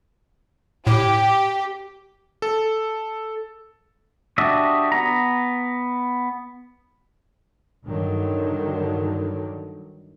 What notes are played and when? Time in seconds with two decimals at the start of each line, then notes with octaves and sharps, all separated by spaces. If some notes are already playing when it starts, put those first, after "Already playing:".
0.87 A2 G4
2.42 A4
4.38 D4 F#4 G4 D#5 E5
4.92 B3 A#5
7.85 G2 D3 D#3 F#3